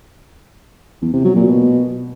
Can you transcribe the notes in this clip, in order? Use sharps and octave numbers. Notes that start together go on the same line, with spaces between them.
E2
C3
F#3
A#2
B2